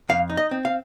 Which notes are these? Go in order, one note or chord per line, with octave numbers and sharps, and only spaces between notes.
F2 F5
D#4
D#5
C4
F5